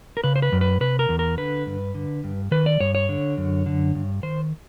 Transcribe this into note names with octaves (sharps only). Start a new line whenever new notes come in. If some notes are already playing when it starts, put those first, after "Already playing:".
A#4
C#3 B4
C5
B4
F#2
B4
C3 B4
A#4
E2
A#4
D3 B4
G2
D3
G2
D#3 B4
D5
G2 C#5
C#5
D3
F#2
D3
G2
D#3 C5